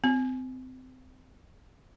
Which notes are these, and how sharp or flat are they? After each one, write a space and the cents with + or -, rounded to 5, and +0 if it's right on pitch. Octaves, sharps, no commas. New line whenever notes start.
C4 -30